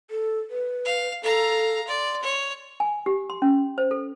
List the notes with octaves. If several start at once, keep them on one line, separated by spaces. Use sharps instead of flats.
A4
B4
F5
A4 F5 A#5
D5 C6
C#5
G#5
G4
C6
C#4
C5
A4